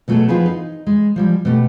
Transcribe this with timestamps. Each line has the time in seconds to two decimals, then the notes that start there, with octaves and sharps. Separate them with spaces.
0.08 B2 F#3 A3 F#4 G#4 A4
0.29 F3 B3 D#4 F4 G#4 B4
0.46 D#4
0.87 G#3
1.16 F3 G3 G#3
1.45 B2 A3 G4